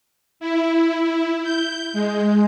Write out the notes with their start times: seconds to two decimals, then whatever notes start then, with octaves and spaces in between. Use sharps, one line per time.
0.40 E4
1.43 G6
1.93 G#3